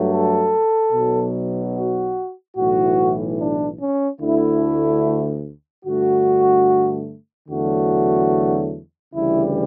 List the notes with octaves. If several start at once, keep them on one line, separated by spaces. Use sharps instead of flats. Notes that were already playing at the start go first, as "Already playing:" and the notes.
Already playing: G2 F#3 A3
A4
B1 B2 F#3
F#4
B1 A2 E3 F#4
D4
C#4
D2 D3 A3 E4
G2 D3 A3 F#4
E2 D3 F#3 A3 F#4
D2 C#3 E3 G3 E4